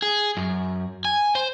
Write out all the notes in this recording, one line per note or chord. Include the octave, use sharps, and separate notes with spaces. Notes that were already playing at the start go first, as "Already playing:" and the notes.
G#4
F#2
G#5
C5